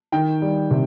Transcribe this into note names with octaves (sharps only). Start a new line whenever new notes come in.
D#3 G5
G3
C3